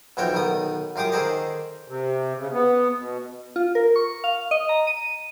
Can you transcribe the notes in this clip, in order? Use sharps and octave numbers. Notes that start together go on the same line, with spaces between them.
B1 E3 F3 F#4 C#5 G5
B1 D#3 B3 D#6
F#2 F4 G4 D6 D#6
D#3 G#4 A4 C5 D5 D#5
C3
C#3
B3
B2
F4
A#4
C#6
F5
D#5
A#5
D#7